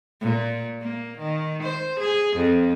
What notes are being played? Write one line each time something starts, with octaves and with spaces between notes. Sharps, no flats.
A#2
A#3
D#3
C5
G#4
F2